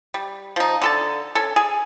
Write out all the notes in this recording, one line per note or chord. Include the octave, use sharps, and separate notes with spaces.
G3
F3 D#4
D3 A4 A5
C#4 A4
G#4